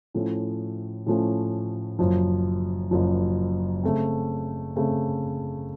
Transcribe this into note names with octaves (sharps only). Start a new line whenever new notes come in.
A2 F3 A3 C#4
A2 F3 A3 C#4
F#1 F#2 F3
F#1 F#2 F3
C#3 A3 C4
C#3 A3 C4